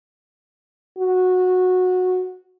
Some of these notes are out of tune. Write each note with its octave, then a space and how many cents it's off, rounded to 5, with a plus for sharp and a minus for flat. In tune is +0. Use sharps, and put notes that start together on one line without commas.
F#4 -15